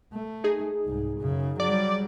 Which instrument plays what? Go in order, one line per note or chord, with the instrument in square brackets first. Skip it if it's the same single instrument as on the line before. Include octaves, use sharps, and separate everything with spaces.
[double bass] A3
[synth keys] D#4 G#4
[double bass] C2 G#2
F#2 C#3
[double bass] F#3 G3 [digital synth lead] D5